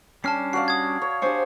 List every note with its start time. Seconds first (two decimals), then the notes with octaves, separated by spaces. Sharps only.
0.24 G3 C#4 D4 A5 F6 C7
0.53 F#4 D5 F5 C7
0.68 D#6 G#6
1.02 C#5
1.22 D4 G4 C5 C#5 G#5